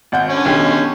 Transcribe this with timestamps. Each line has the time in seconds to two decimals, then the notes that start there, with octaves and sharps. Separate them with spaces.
0.12 G#1 F#5 G6
0.29 D3 C#4
0.45 B1 D#3 G4